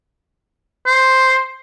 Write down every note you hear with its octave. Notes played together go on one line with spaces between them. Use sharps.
C5